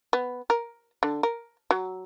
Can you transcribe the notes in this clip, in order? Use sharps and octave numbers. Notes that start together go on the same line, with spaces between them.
B3
A#4
D3
A#4
F#3